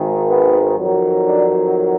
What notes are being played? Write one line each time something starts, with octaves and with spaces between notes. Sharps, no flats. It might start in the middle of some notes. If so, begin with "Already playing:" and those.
Already playing: G#1 G#2 D#3
B3
F2 D#3 F#3
D4